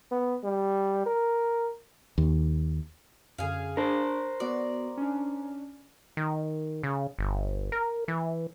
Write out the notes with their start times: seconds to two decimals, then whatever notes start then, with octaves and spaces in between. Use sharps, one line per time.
0.11 B3
0.44 G3
1.06 A#4
2.18 D#2
3.38 F#2 D3 G#4 F5
3.77 D4 A#4 C5
4.40 B3 F#4 D5
4.97 C#4 D4
6.17 D#3
6.83 C#3
7.19 G1
7.72 A#4
8.08 E3